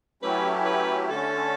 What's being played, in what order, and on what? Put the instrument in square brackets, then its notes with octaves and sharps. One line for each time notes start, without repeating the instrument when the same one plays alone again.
[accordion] F#3 A3 C#4 E4 G4 [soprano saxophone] B4
[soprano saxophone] B4
[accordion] D3 A3 C#4 [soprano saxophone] A4